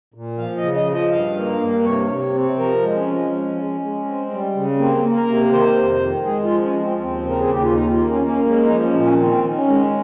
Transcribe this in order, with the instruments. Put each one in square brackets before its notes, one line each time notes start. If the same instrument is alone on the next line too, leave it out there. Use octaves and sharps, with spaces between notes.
[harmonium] A#2
F3 F5
D#5
C#3
D#5
F3
D#5
G2 F5
A#3
G2
C3 C#5
C3
C4
F3 A#4
G#3
C#4
F3
G#3
G#3
G#3
C4
G3
C#3
A#3 C4
A#3
A#4
C3
D#3 C5
F2
D#3
G#3 G#4
F4
F3
C#4
F3
C4
D#2 C4
C#3
A#4
G#4
D#2 G4
F4
D#3 D#4
F4
A#3
C#4
A#3
C#4
G#3 C#4
D#4
F3
C#4
A#2
C#4
D#3 C4
D#3
C#4
G#3